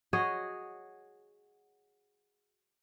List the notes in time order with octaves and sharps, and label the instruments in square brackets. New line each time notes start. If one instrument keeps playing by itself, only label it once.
[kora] F#4 G#4 C#5 D#5